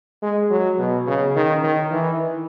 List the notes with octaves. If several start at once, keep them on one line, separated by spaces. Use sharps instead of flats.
G#3
F#3
B2
C#3
D#3
D#3
E3